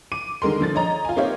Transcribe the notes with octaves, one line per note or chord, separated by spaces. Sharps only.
D6 D#7
D3 D#3 G#3 A#4 C6
D3 F3 A6
C#5 D#5 A#5
F4 G#5
A#3 C4 D#4 G4 C#5 F5